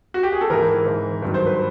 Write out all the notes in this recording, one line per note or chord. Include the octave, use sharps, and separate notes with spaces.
F#4
G4
G#4
A4
G#2 E3 A#4
G#2 E3
G2 D#3 F#3
C5
B4